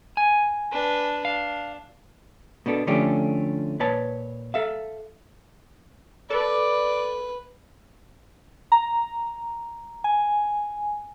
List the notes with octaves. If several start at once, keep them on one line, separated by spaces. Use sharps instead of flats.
G#5
D4 B4
D4 F5
B2 B3 D4 A4
D3 F3 A3 C#4 D4 G4
A#2 B4 C#5 A5
A4 E5 F5
A4 B4 D5
A#5
G#5